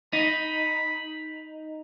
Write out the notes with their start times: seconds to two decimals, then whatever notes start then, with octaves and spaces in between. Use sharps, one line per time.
0.13 D#4 B5